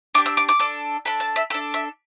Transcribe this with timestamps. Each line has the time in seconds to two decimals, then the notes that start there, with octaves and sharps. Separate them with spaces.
0.15 D4 D6
0.18 G4
0.26 E6
0.37 D6
0.49 D6
0.60 D4 A4
1.05 D4 A4 B5
1.20 A5
1.36 E5
1.50 D4 A4 E5
1.74 E5